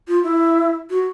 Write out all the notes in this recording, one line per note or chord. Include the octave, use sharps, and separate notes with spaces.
F4
E4
F#4